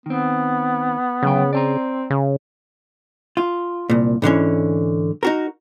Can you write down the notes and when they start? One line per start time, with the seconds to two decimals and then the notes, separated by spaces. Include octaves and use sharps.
0.06 D#3 B3 C4
1.23 D2 C#3 F#3 G5
1.53 C4 D5 A5 A#5
2.10 C#3
3.37 F4
3.90 C2 A#2
4.22 G#2 D3 E3 C#4
5.23 D#4 F#4 A#4